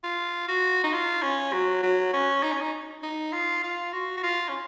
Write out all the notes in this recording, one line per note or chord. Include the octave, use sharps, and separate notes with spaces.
F4
F#4
D#4
F4
C#4
F#3
F#3
C#4
D#4
C#4
D#4
D#4
F4
F4
F#4
F#4
F4
C#4